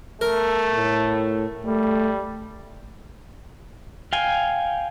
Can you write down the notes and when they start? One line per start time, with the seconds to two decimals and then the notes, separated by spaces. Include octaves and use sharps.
0.21 A3 A#4
0.75 A2
1.66 G3 A3
4.13 F5 G5 G#5